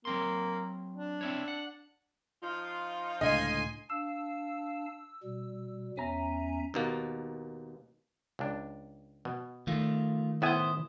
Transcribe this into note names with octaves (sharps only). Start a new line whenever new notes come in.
F#3 A#3 C4 C6
D4
C4 E4 C#5
F#5
F3 D#4 F4
C#2 A2 D3 D#5 G#5 C6
D4 F5 A5 E6
B2 G3
E2 C#4 E5 G#5 A#5
D#2 B2 A#3
C#2 D4
B2
D#3 A3 F4
A2 B3 E4 C5 G#5 D#6